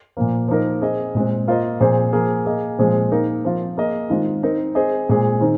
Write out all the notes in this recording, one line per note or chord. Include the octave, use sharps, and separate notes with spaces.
A#2 F3 A#3
F3 A#3 D#4 A#4
C4 G#4 D#5
A#2 G#3 C4
A#3 F4 C5 D#5
A#2 F3 C4 G#4 C5
F3 A#3 G#4
A#3 G#4 D#5
A#2 F3 G#3 C4 G#4
A#3 D#4 A#4
F3 C4 F4
A#3 G#4 D#5
D#3 G#3 C4 F4
C4 D#4 A#4
C4 G#4 C5 D#5
A#2 G#3 C4 G#4
D#3 C4 D#4